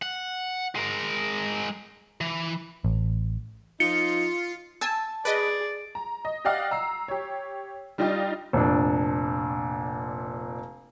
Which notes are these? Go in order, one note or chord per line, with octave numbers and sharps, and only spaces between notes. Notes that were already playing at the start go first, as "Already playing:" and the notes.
F#5
G#3 A#4
E3
A1
F3 D#4 F4 C#7
G#5 A5 E6
G#4 B4 D5 D#5
A#5
D#5
G4 D5 D#5 F5 F#5
A#5 E6 C7
G4 C#5
G3 D4 D#4 F4 G4 D#5
F1 A#2 D4